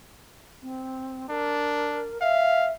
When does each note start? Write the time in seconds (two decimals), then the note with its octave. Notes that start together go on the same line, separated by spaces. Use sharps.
0.62 C4
1.30 D4 A#4
2.21 E5 F5